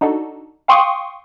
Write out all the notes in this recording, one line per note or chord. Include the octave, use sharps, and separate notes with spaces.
D4 D#4 F#4 A4
F5 G5 C6 C#6 D#6